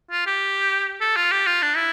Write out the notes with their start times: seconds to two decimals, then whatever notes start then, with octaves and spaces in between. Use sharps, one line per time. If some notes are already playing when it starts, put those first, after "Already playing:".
0.11 F4
0.27 G4
1.01 A4
1.17 F4
1.32 G4
1.47 F4
1.62 D4
1.76 E4